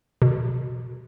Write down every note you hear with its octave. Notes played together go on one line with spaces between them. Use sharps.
B2